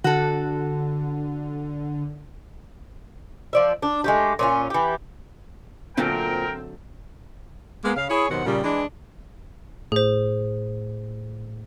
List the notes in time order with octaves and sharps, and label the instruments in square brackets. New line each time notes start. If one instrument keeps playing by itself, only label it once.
[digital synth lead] D3 [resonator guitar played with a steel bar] F#4 A4
[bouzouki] F3 D5 E5
D4
G#3 A3 G4
A#2 C#4 F4
E3 G4
[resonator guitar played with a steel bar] A#2 [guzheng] D3 F#3 A3 [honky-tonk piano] C4 [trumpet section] A#4 G5
[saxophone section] G#3 A#3 B3
C#3 F5
E4 G#4 C#5
D#2 B2 D#3 F#3 C5 F#5
A#2 C#3 G3
E3 G#3 D4
[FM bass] A2 [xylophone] G#4 C5